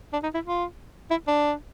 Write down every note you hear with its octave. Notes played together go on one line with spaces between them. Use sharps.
D4
D#4
E4
F4
E4
D4